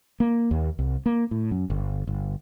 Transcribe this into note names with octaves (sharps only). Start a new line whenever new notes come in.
A#3
D#2
C2
A#3
A2
F#2
G1
G1